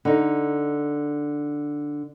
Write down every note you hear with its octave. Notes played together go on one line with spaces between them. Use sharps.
D3 D#4